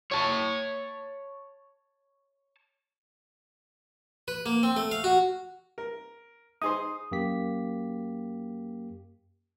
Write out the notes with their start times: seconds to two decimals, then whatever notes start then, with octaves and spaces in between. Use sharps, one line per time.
0.12 C#5 A5
4.28 B4
4.46 A#3
4.63 C4
4.76 A3
4.91 F5
5.04 F#4
5.78 A#4
6.62 D#4 G#4 C5 D#6
7.11 F#2 A#3 G4 B6